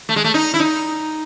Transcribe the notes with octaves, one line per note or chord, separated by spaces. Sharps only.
A3
G#3
A3
D#4
E4
D#4